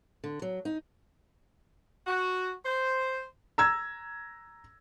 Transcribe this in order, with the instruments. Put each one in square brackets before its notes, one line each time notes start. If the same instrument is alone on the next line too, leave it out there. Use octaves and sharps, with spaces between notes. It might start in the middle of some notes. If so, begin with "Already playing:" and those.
[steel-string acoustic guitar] D3
F#3
D#4
[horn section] F#4
C5
[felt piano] A#5 E6 G#6